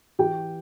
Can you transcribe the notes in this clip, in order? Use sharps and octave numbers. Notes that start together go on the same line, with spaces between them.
E3 G4 G5